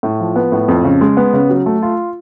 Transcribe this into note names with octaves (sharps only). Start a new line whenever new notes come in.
A2
F3
B3
A2
F2
C#3
G#3
B3
C#3
F#3
A3
F4